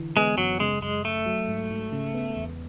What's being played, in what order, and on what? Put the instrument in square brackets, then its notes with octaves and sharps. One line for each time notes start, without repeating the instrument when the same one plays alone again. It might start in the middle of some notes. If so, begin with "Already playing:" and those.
Already playing: [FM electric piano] D3 E3
[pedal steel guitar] G#3 [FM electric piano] B3
[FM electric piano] F#2 [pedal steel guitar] F#3
[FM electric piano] C#3 [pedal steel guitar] G#3
[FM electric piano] F#2 [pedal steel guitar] G#3
[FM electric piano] F#2 [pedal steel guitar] A3
[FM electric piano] F#3
G#2
G#2
C#3
B3
E2